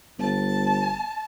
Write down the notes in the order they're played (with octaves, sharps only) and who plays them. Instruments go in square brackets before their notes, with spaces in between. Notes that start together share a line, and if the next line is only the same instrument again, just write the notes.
[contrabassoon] G1 [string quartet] A5